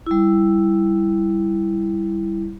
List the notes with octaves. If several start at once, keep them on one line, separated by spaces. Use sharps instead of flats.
G3 E4